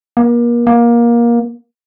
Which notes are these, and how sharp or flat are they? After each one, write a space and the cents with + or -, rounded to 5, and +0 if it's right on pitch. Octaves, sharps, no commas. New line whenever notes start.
A#3 +35
A#3 +20